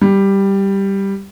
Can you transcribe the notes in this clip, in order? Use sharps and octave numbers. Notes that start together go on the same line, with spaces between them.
G3